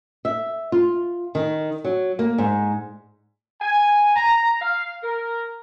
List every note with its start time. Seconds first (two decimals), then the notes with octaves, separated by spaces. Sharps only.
0.25 E5
0.72 F4
1.35 D#3
1.84 F#3
2.19 A#3
2.38 G#2
3.61 G#5
4.16 A#5
4.61 F5
5.03 A#4